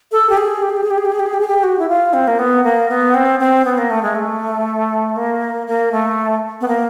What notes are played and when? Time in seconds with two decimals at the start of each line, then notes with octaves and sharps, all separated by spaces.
0.12 A4
0.29 G4
0.37 G#4
0.62 G4
0.70 G#4
0.76 G4
0.83 G#4
0.90 G4
0.98 G#4
1.05 G4
1.12 G#4
1.19 G4
1.26 G#4
1.34 G4
1.40 G#4
1.47 G4
1.63 F#4
1.79 E4
1.89 F4
2.13 C4
2.27 A#3
2.39 B3
2.64 A#3
2.89 B3
3.14 C4
3.40 C4
3.65 B3
3.78 A#3
3.90 A3
4.02 G#3
4.15 A3
5.16 A#3
5.67 A#3
5.92 A3
6.61 B3
6.68 A#3